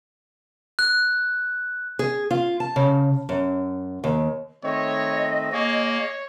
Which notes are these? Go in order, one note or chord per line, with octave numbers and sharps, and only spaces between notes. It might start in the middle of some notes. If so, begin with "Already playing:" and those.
F#6
G#4
F4
A5
C#3
F#2
D#2
D#3 A3 C4 C#5 D#5
A#3 G#4 C#5